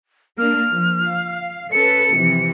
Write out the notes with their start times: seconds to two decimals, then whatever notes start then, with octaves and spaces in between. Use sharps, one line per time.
0.38 A#3 D4 F6
0.70 F3
1.06 F5
1.72 C#4 A4 B4 C#7
2.17 C3 E3 F3